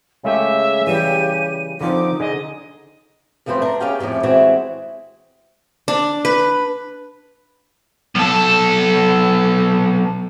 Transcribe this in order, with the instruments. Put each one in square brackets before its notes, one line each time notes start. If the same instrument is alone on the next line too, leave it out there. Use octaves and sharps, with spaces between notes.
[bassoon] C#3 [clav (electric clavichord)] G#3 A3 G4 [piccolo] E5
[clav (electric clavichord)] E3 G3 [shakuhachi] G4 [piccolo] D#7
[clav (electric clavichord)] D3 F3 C4 [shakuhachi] D#4 [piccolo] D6
[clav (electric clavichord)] D3 G#4 [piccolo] D#5
[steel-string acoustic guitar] F#2 F3 A3 C4 B4 C5
D4 A#5
C#4 G4 G#4 F5 G5
F2 A2 C3 G4 D5
E3 G#3 C4 E4 F#4 C#5
[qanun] D4
B4
[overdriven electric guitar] B1 A4